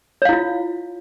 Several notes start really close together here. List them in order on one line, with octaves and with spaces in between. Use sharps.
C#5 F5 E4 F4